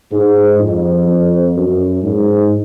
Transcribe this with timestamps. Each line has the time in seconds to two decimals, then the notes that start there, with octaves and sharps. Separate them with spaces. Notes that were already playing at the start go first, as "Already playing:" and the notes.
0.11 G#2
0.59 F2
1.06 F2
1.55 F#2
2.03 G#2